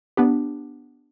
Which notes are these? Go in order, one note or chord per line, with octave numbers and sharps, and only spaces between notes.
B3 D4 G4